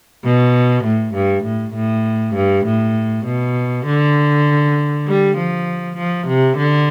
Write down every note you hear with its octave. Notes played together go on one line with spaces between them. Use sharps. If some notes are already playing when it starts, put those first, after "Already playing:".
B2
A2
G2
A2
A2
G2
A2
B2
D3
G3
F3
F3
C3
D3